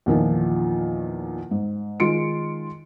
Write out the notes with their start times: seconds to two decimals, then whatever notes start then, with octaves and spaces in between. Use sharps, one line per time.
0.06 E2 A#2 D#3 F3
1.51 G#2
2.00 D#3 G#3 F4 C6 C#7 D7